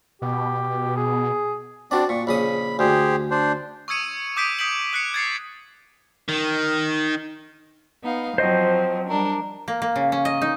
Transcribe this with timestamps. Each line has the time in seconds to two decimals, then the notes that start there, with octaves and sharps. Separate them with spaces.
0.22 B2 G4
0.97 G#4
1.91 C4 D4 F#4 D5
2.09 A#2 C#6
2.27 A#1 C#3 B5 D#6
2.79 D2 G4 G#4 C5
3.31 D4 C5
3.88 C#6 D#6 E6 G#6 C#7 D#7
4.36 D6 D#6 G6 B6 D7 D#7
4.59 D#6 G6 B6 D7 F#7
4.93 D#6 F#6 B6 C#7
5.14 G#6 A6 C7 C#7
6.29 D#3
8.03 B3 D#4 F5
8.38 F3 F#3 C4 C5 D#5
9.09 G3 D4 A#4
9.68 A#3
9.82 A#3
9.96 C#3
10.12 C#4
10.25 D#5
10.42 D#4